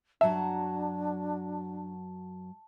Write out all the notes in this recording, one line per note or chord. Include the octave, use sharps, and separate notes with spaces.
F#2 F#3 D4 F#4 E5 A5